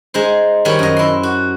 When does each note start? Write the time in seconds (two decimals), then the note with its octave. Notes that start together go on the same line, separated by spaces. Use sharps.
0.14 G#3 D#4 C5
0.65 D#3 G3 C5 C#5 B5
0.79 F#2 D#5
0.96 E4 C6
1.23 F#4